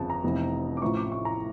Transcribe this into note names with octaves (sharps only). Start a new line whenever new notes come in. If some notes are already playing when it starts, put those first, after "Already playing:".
Already playing: G1 F2 C#3 F3 A5
A#5
F1 F2 E3
D6
A1 A2 F3 C#6
D6
C#6
A#5